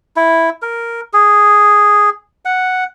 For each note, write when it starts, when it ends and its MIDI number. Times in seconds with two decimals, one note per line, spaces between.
0.16 0.50 64
0.62 1.01 70
1.13 2.10 68
2.45 2.84 78